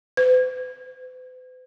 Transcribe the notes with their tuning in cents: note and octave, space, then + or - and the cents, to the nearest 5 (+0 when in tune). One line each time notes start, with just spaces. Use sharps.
B4 +45